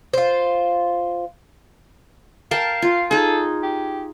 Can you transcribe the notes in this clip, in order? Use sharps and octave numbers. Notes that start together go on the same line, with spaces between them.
F4 C5
A#4 F5 G5 A5
F4
D#4 G#4 A4
G4